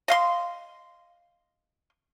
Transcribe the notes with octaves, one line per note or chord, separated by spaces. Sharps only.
D#5 F5 C6